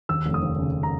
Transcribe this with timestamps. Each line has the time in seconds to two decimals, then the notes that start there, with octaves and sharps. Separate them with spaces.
0.09 D#2 E6
0.26 F1
0.34 D#6
0.43 D#2
0.58 C#3
0.83 A#5